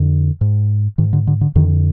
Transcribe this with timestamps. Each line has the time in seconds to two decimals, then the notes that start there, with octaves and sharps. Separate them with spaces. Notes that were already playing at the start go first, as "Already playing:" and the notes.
Already playing: F2 D3
0.41 G#2
0.98 G#2 D#3
1.13 D3
1.27 D3
1.41 D3
1.55 F2 D3 D#3